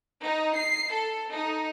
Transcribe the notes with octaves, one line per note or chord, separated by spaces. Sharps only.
D#4
C7
A4
D#4